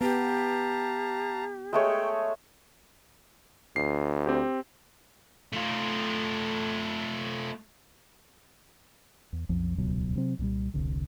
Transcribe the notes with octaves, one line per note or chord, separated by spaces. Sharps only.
B3 G4 F5 A5 A#5
G#3 A3 C#5 G5
D2 C7
C4 G4
A3 F4
E2
B1 F2 F3
D#1 C#2 B2 F#3
C3 F#3 C4
C2 A#2 F#3 G3
E1 C2 D3